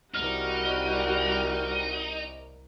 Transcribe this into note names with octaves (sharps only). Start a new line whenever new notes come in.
C2 G3 D#4 F#4 A#4 F6